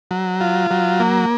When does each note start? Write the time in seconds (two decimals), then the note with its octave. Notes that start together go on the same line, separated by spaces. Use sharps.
0.11 F#3
0.41 F4
0.71 F#3
1.00 A#3